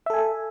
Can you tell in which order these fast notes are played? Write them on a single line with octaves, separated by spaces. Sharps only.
E5 A4 G#5